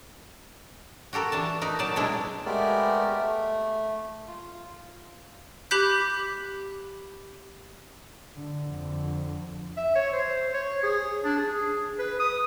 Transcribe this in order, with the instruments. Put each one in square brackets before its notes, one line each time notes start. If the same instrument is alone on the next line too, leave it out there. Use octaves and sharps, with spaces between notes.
[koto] F#4 G4 A4 A#4
E3 D4 A5
D#4 A#4 B4
A#2 F#3 D5 A5
B2 G#3 D4 E4
[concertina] G#3 A3 B3 G4 A#4 D5
A3
F4
[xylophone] G4 B5 D6 F#6 G6 B6
[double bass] D3
F2 D3
[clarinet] E5
C#5
C5
C#5
G#4
D4
G#4
B4
D#6